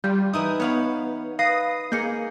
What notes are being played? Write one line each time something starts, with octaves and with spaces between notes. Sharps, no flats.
G3 F4 G6
E3 D#4 E4 D#6
B3 C#5 F5 B5
B4 F5 D#6 A#6 C7
A#3 G#4 D#5 G6 C#7